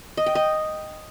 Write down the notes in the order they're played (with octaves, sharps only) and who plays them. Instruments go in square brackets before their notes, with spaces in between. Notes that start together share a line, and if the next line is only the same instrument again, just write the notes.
[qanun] D#5
G5
D#5